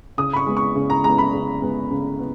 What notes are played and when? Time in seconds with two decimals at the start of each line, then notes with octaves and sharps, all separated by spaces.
0.18 C#3 D#6
0.33 B5
0.37 C#6
0.46 G#3 B3
0.57 C#6
0.75 C#3
0.90 A#5
1.04 G#3 B3 A#5
1.18 B5
1.33 C#3
1.62 G#3 B3
1.91 C#3
2.19 B3